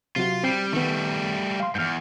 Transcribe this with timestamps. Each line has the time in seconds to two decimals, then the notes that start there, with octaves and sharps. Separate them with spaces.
0.16 C3 F#3 F4 F#4
0.44 G3 C4 G5
0.73 D#3 G3 A3 B3
1.60 F5 C6
1.75 E2 G#2 F6 G6